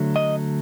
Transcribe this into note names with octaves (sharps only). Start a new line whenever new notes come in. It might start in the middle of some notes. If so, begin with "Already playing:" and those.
Already playing: D3 F#3 A3 D4
D#5